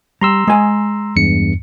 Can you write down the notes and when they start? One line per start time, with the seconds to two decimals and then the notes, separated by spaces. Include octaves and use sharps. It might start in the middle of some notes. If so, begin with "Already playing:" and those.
0.21 G3 A#5 C6 E6
0.47 G#3 G#5
1.16 E2 G2 C#7